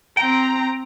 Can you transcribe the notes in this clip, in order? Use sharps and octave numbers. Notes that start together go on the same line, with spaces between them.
C4 G5 A#5